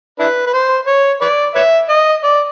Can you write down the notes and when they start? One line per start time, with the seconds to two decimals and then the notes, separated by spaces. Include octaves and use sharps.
0.19 D4 E4 B4
0.47 B4
0.53 C5
0.87 C#5
1.21 B4 D5
1.55 B4 C#5 E5
1.89 D#5
2.23 D5